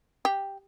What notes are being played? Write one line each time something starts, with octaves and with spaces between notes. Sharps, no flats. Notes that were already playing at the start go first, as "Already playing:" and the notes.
G4